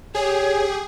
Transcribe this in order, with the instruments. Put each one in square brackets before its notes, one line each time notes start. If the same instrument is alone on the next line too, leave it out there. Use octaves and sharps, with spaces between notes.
[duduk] G4 [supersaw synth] G#4 [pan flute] C#5